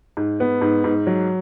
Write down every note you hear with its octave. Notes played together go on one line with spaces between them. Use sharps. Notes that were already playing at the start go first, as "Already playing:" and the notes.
G#2
B3
G#2
G#2
F#3